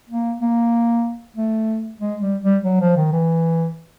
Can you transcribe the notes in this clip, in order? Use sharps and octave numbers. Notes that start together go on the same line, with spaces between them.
A#3
A#3
A3
G#3
G3
G3
F#3
F3
D#3
E3